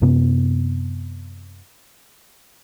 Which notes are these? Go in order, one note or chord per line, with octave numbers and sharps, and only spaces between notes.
F#2 C3 B3